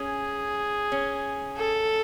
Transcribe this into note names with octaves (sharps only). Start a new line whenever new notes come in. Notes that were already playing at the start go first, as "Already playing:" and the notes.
Already playing: C#4 G#4
C#4
A4